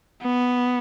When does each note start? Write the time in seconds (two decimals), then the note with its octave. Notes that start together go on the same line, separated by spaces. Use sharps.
0.22 B3